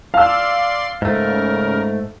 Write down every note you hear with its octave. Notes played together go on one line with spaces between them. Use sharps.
D5 F5 C6 E6
G#2 C#3 A3 A#4